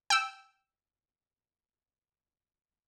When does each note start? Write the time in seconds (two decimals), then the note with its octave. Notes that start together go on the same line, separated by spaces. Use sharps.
0.10 G5 E6